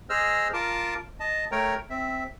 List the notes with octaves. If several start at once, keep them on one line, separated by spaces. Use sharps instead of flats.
G#4 C5 D#5 E6 F6
F4 A#4 A5 D6
D#5 A5
A3 A#4 C#5 G5 A#5
C4 E5